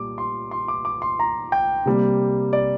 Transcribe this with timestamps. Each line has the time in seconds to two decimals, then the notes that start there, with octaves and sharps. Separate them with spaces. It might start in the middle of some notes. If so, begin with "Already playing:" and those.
Already playing: A#2 G3 D6
0.18 C6
0.51 C6
0.68 D6
0.85 D6
1.02 C6
1.19 A#5
1.52 G5
1.86 C3 G3 A#3
2.53 D5